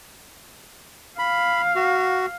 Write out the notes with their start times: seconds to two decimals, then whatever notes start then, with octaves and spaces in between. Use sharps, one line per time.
1.19 F5 B5
1.76 F#4